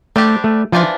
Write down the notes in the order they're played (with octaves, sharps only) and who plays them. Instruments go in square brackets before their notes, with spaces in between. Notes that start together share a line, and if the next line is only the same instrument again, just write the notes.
[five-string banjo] G3 D4 G4 C5 [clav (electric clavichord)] A3
[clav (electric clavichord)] A3
[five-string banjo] E3 A3 D4 F4 C5 [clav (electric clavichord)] F3